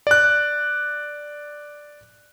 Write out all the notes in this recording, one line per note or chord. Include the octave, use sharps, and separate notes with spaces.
D5 F#6